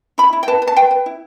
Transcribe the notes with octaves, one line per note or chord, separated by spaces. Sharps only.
E4 B5
E4
G5
B4 A5
B4
A5
B4 G5
B4
E4